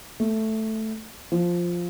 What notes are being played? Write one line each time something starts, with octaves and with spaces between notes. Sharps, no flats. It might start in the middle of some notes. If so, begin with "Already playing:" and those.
A3
F3